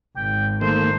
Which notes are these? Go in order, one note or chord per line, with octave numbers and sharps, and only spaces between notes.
G#1 G5
D#3 A3 A#3 C5